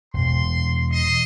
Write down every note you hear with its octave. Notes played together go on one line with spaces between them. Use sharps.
E1 C6
D#5 C6